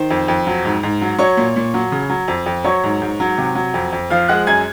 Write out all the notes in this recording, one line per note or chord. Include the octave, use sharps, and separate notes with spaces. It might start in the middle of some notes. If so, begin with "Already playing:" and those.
Already playing: D#3 C5
F2
F2
F#3
G#2
G#2
F#3
F#3 C#5 C#6
A#2
A#2
F#3
C#3
F#3
F2
F2
F#3 C#5 C#6
G#2
G#2
F#3
C3
F#3
F2
F2
F3 F5 F6
G#3 F#5 F#6
F#2 G#5 G#6